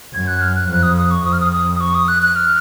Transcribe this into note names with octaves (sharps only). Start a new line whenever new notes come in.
F#2 G#6
F#6
F6
F#6
F2 F#6
D#6
D#6
C#6
F2 D#6
F6
D#6
D#6
D#6
C#6
D#6
F#6
F#6
F6